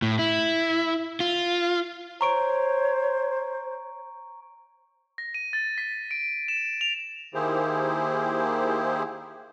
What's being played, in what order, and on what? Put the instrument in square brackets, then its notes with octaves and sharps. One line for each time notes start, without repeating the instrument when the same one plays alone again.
[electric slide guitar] A2
E4
F4
[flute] C5 [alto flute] C#5 [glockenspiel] A#5 C#6 D7
[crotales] A#6
D#7
A6
B6
D7
E7
F7
[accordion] D#3 A#3 E4 G4 G#4 C5